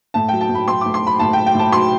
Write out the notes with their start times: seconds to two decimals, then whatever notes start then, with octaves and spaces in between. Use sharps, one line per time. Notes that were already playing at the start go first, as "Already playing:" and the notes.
0.14 A2 A5
0.29 G5
0.33 F#3
0.41 A5
0.50 A2
0.55 B5
0.68 F#3 C6
0.81 D6
0.86 A2
0.94 C6
1.02 F#3 B5
1.20 A2 A5
1.33 F#3 G5
1.46 G5
1.55 A2 A5
1.72 F#3 C6